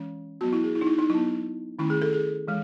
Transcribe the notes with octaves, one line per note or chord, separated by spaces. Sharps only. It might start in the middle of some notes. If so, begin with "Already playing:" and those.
Already playing: E3 G#3 C#4
F#3 B3 F#4
E4
G#4
E4
D#4
E4
D#4
F#3 B3 E4
D#3 A3 C#4 E4
G#4
A4
G#4
E3 G#3